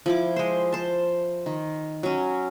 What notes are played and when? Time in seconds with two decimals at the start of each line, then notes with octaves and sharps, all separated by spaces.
0.06 F3 E4 D6
0.36 G#3 C5
0.72 C5 A5
1.46 D#3
2.03 F#3 C#4